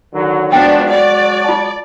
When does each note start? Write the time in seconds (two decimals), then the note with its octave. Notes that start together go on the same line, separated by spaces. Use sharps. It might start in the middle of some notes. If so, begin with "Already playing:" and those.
0.13 D3 D#3 F#3
0.52 F3 F#3 G#3 B3 D4 F#4 D#5 G5
0.90 D5 D#5
1.44 F4 A5